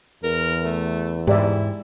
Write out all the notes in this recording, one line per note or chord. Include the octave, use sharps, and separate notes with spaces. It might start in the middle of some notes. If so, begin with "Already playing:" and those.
E2 A#4
A3
G#2 E4 G4 D5 E5